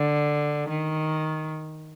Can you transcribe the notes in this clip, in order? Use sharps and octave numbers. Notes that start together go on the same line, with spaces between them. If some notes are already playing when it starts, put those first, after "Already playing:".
Already playing: D3
D#3